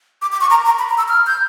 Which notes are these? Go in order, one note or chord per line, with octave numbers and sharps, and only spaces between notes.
D6
D6
C#6
A#5
A#5
B5
A#5
E6
F6
G6